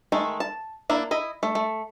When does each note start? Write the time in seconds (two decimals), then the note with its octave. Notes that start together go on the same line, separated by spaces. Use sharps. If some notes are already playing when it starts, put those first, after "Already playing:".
0.12 D#3 G#3 A3
0.40 A5
0.90 A#3 D4 E4
1.11 E4 D#5
1.43 A3
1.55 A3